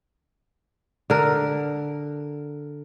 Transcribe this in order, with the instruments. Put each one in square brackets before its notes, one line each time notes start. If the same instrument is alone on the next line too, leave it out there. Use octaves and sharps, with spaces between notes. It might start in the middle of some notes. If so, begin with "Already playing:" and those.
[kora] D3 A#4